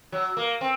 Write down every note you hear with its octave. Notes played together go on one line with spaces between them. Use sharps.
F#3
A#3
C4